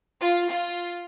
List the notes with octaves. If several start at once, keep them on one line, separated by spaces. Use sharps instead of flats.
F4
F4